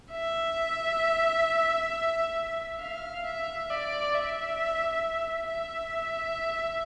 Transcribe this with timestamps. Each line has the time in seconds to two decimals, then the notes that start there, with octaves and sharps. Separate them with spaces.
0.12 E5
2.80 F5
3.25 E5
3.70 D5
4.15 E5
5.48 E5